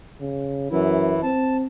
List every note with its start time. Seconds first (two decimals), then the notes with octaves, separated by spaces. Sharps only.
0.20 C#3
0.71 F#2 E3 E4
1.23 C4 A5